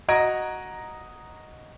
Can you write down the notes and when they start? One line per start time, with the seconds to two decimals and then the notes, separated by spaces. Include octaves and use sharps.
0.08 F#4 D#5 A#5 G#6 A#6 D7